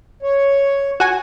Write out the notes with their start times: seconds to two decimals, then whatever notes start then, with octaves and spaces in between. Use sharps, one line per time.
0.23 C#5
1.00 F#4 G#5